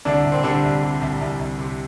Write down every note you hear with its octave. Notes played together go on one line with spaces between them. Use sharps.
C2 D3 D4
C2
C4
D3 G3 D4
C2
C3
C2
C2
C2
C3